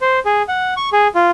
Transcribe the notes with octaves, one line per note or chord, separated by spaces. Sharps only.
C5
G#4
F#5
C#6
G#4
F4